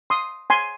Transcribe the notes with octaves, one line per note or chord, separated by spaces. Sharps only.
C6 D#6
G#5 C6